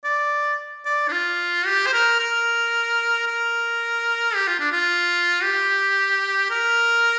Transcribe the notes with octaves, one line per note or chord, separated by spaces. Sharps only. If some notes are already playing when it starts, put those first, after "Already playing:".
D5
D5
D4
F4
G4
C5
A#4
A#4
A#4
G4
F4
D4
F4
G4
A#4